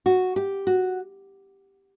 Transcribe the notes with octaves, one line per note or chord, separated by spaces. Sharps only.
F#4
G4
F#4